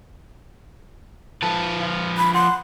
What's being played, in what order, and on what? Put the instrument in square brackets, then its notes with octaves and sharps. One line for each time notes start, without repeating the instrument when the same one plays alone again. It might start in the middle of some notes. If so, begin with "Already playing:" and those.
[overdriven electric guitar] F3 B4 [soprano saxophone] A5
[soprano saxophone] F4
[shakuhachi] B5
[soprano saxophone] F#5 [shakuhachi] C6